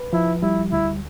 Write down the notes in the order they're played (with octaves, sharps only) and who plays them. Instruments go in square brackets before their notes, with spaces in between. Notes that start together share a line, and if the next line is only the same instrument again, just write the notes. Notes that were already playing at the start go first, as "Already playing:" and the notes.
Already playing: [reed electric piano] B4
[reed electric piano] F3 [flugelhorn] E4
[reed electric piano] G3 [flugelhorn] E4
[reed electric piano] D2 [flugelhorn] E4